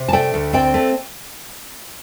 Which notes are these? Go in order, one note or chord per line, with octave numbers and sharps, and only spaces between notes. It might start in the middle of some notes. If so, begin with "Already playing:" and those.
Already playing: C3
A5
A3 D5 G5
D2
C4 D5 G5
A3